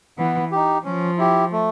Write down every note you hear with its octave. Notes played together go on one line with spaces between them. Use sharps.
E3 B3
D#4 G4
F3 C#4
E4 G4
A3